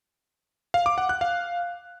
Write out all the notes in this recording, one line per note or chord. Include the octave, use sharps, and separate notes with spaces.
F5
D6
F#5
F#6
F5